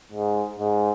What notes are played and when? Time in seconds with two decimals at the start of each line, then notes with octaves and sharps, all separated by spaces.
0.12 G#2
0.58 G#2